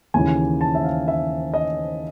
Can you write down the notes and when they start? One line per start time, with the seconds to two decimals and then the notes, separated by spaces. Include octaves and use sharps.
0.14 D#2 C#3 E3 G#5
0.61 A5
0.75 E5
0.84 F5
1.08 E5
1.54 D#5